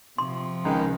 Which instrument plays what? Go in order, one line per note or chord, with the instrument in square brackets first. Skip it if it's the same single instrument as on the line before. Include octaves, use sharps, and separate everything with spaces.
[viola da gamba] C3 F3 [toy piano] C6
[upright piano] C#2 [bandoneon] D#3 G#3 D#4